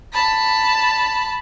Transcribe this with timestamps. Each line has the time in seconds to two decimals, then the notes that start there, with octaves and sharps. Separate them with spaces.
0.13 A5 B5